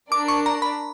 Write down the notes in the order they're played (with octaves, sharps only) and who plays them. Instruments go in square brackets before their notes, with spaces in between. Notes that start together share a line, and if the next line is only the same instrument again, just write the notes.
[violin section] D4 A#4 D5 [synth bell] D6
[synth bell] C#6
A#5
B5